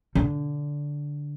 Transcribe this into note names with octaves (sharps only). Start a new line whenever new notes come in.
D3